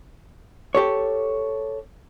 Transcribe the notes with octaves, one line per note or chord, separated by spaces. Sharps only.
G4 A4 C#5